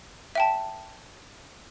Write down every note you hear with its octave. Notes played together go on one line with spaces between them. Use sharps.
E5 G5 A5